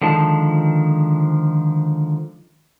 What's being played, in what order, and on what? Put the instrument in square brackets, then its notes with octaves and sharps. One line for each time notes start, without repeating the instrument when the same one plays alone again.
[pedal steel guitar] D3 D#3 F3 G#3 A5